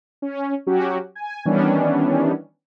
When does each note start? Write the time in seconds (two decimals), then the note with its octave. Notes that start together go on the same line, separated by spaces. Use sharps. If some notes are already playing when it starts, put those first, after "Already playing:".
0.22 C#4
0.67 F#3 C#4 F#4 G4
1.15 G#5
1.45 D#3 E3 G3 B3 C#4 D4